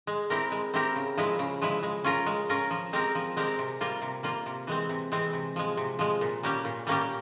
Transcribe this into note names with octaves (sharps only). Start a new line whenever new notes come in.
G#3
C4 E4 G4 A#4
G#3
C4 E4 G4 A#4
C#3
F3 G#3 E4
C#3
F3 G#3 E4
G#3
C#4 F4 A#4
G#3
C#4 F4 A#4
F3
G#3 C4 G4 A#4
F3
G#3 C4 G4 A#4
C3
G3 A#3 F4
C3
G3 A#3 F4
C3
E3 G#3 C4
C3
E3 G#3 C4
C3
F3 G#3
C3
F3 G#3
A#2
G3 A#3 C#4 G4
A#2
G3 A#3 C#4 G4